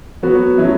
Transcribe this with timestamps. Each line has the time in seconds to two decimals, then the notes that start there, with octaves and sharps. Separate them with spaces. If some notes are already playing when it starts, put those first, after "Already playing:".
0.23 F#3 B3 F#4
0.58 A2 F#3 C#4 E4